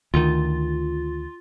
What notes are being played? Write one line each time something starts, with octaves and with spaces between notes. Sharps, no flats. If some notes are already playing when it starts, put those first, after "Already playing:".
D2 D#3 F4